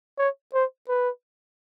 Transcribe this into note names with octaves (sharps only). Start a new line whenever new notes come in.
C#5
C5
B4